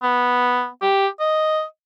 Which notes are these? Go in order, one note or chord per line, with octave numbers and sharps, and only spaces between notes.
B3
G4
D#5